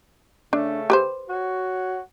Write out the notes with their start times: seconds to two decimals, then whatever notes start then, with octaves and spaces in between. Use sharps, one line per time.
0.53 C#3 A3 D4
0.90 G4 B4 C5
1.29 F#4 C#5